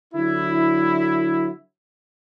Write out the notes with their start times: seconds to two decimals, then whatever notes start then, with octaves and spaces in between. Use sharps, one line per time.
0.14 D3 F#3 E4